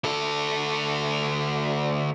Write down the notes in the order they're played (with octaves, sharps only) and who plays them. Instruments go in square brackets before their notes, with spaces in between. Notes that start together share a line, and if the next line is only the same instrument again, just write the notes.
[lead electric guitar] D2 A4